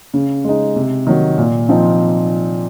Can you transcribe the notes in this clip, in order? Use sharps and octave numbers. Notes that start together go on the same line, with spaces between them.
C#3
G#3 D#4
C3
D#3 F#3
A#2
F3 C4 D#4